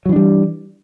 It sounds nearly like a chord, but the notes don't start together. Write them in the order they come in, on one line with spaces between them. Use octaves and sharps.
F#3 E3 D4 G3